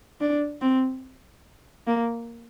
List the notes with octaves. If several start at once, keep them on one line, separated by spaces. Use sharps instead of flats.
D4
C4
A#3